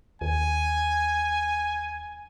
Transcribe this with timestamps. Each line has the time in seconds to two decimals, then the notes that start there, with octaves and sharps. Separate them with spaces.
0.21 D#2 G#5